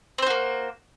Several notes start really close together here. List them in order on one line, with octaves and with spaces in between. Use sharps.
C4 C5 F#4 A#3